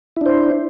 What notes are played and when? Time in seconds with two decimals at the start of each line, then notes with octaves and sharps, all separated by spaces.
0.17 E4
0.21 D4
0.26 C5